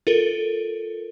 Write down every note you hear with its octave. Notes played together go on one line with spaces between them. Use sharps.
F4 A4 A#4